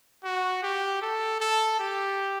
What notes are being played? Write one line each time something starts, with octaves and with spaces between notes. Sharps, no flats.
F#4
G4
A4
A4
G4